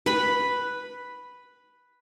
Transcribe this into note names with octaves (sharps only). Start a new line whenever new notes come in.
B4 B5